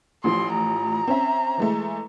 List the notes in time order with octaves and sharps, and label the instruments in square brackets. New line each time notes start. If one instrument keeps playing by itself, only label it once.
[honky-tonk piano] A1 A2 F3 [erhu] C6
[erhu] A#5
[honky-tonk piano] C4 C#4 E5
E3 G#3 A3